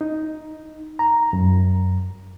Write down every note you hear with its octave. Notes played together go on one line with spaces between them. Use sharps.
D#4
A#5
F#2